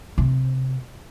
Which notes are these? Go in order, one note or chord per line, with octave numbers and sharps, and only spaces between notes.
C3